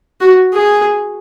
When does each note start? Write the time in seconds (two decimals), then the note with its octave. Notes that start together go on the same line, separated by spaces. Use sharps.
0.21 F#4
0.54 G#4